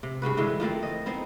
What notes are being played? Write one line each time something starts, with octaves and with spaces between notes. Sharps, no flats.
C3
G2 C#3 F#4 B4
D3 E3 G#3 E5
F3 A3 A#3 C4
D#5
B3 C4 D#4